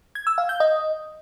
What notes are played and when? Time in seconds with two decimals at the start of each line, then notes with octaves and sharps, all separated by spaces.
0.15 G#6
0.27 E6
0.38 F5
0.49 G6
0.60 D#5